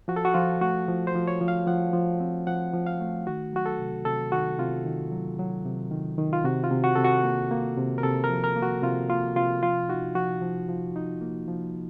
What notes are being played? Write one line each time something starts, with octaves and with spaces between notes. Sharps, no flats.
F3 F#4
A4
F#4
F3 F4
A3 F#4
F3
C5
F3
C#5
F3
F5
F3 F#5
F3
C4
F3 F#5
F3
F5
A3
D#3 F#4
F#3 F#4
A4
C3
C3 A4
D#3 F#4
C3 F4
D#3
F#3
F#3
C3
D#3
D#3
F4
C3 F#4
F4
C3
F#4
C3 A4
F#4
A#3
A#3
C3
A#4
C3 A4
A#4
F3
A#4
A#3
F#4
C3 F4
A#3 F4
C3 F4
F3 F4
D#4 F#4
F3 F#4
F3
F3
D#4
A#3
F3